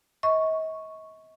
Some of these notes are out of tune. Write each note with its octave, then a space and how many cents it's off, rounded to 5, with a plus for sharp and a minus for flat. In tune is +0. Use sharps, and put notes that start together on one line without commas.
D#5 +40 C#6 +0